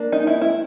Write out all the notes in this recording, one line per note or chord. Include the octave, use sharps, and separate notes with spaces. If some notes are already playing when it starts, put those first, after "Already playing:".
Already playing: A#3 D4
D#4
E4
E4